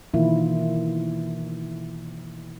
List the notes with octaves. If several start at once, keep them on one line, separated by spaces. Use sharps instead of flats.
B2 D#3 E3 A#3 E4 F4